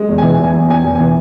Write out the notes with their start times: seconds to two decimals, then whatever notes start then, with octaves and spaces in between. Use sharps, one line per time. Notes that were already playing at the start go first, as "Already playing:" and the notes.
Already playing: G#3
0.09 E2
0.18 E3 G#5
0.39 E2 G#5
0.54 E2
0.69 E2 G#5
0.85 E2
0.95 E3 G#5